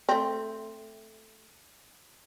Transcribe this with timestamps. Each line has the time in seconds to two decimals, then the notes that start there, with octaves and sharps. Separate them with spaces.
0.09 A3 C4